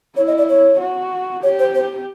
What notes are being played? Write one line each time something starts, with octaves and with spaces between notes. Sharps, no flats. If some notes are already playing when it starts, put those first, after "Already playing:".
E4 C#5
D#5
D5
C#5
F#4
G4 C#5
C5
C5